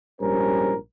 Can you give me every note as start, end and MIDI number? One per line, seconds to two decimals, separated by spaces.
0.21 0.76 34
0.21 0.76 44
0.21 0.76 55
0.21 0.76 61
0.21 0.76 70
0.21 0.76 72